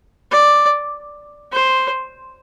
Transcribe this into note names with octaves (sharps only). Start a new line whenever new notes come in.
D5
C5